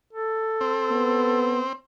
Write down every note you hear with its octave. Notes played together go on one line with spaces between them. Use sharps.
A4
C4
B3